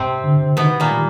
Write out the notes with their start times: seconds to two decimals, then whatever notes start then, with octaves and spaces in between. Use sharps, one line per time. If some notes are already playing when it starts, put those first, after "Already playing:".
Already playing: G2 C3 C4
0.24 D3
0.57 B2 D#3 B3
0.80 A#2 A#3
0.91 G3